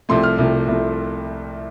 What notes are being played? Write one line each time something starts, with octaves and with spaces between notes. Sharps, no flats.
C2 C3 F3 A3 C6
F6
C2 C3 F3 A3
C2 C3 F3 A3